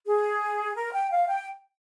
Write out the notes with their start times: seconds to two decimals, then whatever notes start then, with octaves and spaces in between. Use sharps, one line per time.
0.06 G#4
0.76 A#4
0.93 G5
1.11 F5
1.28 G5